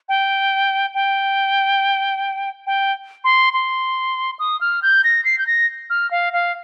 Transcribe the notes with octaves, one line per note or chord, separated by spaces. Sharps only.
G5
G5
G5
C6
C6
D#6
F6
G6
A#6
C7
G6
A#6
F6
F5
F5